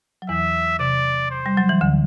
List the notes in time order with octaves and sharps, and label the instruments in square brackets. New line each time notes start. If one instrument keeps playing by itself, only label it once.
[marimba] F#3
[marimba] E2 E3 [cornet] E5
[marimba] C3 [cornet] D5
[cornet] C5
[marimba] G3
F#3
E3
D2 D3